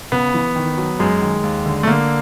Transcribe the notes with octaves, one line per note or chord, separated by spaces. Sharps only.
C#3 B3
E3
D#3
F#3
F#2 G#3
D#3
D#2
D3
A3
D3 A#3